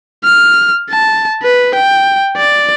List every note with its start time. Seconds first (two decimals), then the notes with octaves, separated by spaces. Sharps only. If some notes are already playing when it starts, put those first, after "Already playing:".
0.25 F6
0.90 A5
1.43 B4
1.75 G5
2.37 D5